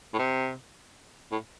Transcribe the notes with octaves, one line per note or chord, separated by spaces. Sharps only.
A2
C3
A2